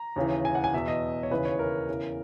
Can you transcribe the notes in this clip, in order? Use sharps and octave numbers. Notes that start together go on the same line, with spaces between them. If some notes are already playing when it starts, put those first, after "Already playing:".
Already playing: A#5
D#2 C#3 E3
G#5
F#5
G#5
E2 B2 E5
D#5
C#5
D#2 C#3 E3 B4
C#5
A#4
E2 C#3 E3